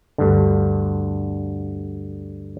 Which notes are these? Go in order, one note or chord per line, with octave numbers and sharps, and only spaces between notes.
D2 G2 D3